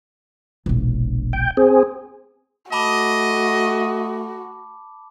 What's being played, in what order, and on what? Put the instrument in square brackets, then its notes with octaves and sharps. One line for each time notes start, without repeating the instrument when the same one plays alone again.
[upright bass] E1 A#1
[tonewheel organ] G5
C4 G#4
[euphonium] A3 [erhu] F#4 [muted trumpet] D#5 [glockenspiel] A5 B5 D6